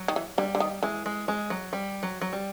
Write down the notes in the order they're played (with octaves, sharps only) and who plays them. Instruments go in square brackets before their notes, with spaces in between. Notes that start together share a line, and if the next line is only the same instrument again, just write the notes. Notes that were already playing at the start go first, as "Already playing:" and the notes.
Already playing: [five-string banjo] F#3
[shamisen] D#3
E3
[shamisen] D3 [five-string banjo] G3
[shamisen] D3
D#3
[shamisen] E3 [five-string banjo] G#3
[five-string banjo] G#3
G#3
F#3
G3
F#3
F#3
G3